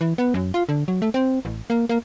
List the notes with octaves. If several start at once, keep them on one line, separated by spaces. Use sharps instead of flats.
E3
B3
F#2
F4
D3
F#3
A3
C4
A1
A#3
A#3